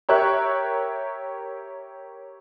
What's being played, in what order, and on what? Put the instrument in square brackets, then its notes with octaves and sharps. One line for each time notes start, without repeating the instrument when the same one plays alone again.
[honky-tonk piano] G4 A#4 C#5 E5 C#6 F#6